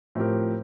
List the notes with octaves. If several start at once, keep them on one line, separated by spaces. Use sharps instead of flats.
A2 F3 C4 G4 A#4